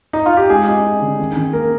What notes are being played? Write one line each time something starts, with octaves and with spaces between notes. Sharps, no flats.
D#4
F4
G4
G#3 G#4
D#4
D#4
D3
D#3
D#3
A#3 A#4